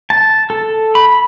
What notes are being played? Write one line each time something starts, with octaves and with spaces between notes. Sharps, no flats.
A5
A4
B5